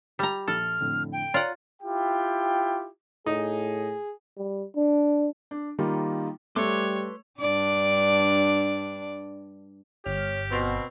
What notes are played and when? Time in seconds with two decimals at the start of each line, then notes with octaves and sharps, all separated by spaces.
0.19 G3 A#5
0.47 A#1 A4 F6
0.80 F2 A2 D3
1.12 G5
1.34 F4 C#5 D5 F#5 A#5
1.82 E4 F4 G4 G5
3.26 A2 D#4 G#4
4.37 G3
4.76 D4
5.51 D4
5.79 D#3 G3 A#3 D#4 F4
6.56 G3 A3 B4 C#5 C6 D6
7.40 G2 D4 D5
10.06 G1 G4 C#5 F6
10.51 B2 B3 C4